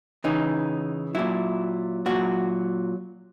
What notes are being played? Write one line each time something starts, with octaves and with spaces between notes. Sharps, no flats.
C#3 E3 D#4
A#2 F#3 E4
A#2 F#3 F#4